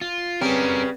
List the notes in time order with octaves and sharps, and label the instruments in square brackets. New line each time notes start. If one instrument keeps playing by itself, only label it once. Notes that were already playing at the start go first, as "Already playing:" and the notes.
[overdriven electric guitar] F4
[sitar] C#3 G3 [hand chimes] C4 [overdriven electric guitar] C#4 A#4 [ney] B4